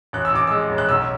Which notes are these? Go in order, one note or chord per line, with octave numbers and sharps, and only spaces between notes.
A1 F#6
E6
A1 D6
G#3 E6
A1
F#6
B1 E6